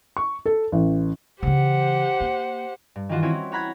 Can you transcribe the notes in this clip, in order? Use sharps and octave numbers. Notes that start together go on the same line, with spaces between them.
C#6
A4
A1
C#3 E3 G4 C5 F#5
A#3
G2
D#3 E3 F4 F#4
C4 C#4 E4 F#4 C5 C#5
C#5 F#5 A#5 B5 F#6 G#6